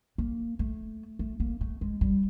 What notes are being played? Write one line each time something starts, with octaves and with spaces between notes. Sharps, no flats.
A#3
A3
A3
A#3
A3
G#3
G3